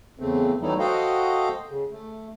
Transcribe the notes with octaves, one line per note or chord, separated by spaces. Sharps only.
E2 C#3 A3 C4
E3 F#3 G3 A3 D#4 E4
F#4 A4 C5 D#5 F5 G5
C#3
A3